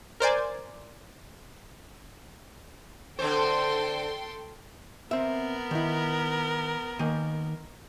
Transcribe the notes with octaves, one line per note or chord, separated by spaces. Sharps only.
A#4 C5 D5 G#5
D3 C4 A4 C5 G5 C6
B3 C4 A#4 E5
D#3 E4
D#3 A#3 G#5